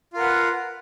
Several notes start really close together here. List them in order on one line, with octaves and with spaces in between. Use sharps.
F4 A#4 F#5 B4